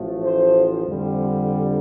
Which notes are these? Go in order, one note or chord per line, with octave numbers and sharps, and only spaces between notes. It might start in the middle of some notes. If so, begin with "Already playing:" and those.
Already playing: A1 A2 F3 A3
C5
F2 D3 G3